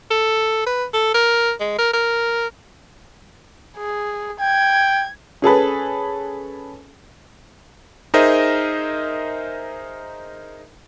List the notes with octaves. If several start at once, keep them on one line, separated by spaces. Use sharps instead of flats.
A4
B4
A4
A#4
G#3
A#4
A#4
G#4
G5 G#6
C#4 G#4 A4 B4
D#4 G#4 A#4 C5 D#5 E5